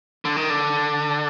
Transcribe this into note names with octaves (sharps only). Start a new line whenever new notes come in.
D3
D#3
D3